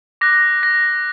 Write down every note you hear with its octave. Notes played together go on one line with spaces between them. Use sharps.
D6 F#6 A#6
A#6